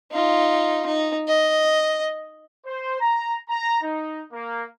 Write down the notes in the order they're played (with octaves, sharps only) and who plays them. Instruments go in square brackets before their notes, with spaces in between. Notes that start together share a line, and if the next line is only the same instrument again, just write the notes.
[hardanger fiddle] D#4 F4
D#4
D#5
[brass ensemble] C5
A#5
A#5
D#4
A#3